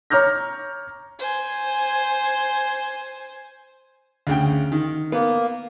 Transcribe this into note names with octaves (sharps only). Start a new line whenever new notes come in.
C#5 A#5 D6 F6 G6 A#6
C5 G#5
D2 C#3 G5
D#3
A#3 B3